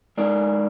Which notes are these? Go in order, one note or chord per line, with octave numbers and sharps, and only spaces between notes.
G#3 D#4 A#4 D5